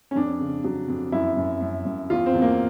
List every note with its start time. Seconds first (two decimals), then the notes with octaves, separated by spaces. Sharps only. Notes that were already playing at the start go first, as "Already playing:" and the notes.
0.11 C#4
0.15 F2 D4
0.41 C#3
0.64 F#3
0.88 F2
1.12 F#2 E4
1.37 F#2
1.61 F#2
1.85 F#2
2.10 E2 F4
2.26 C4
2.34 E2
2.42 A#3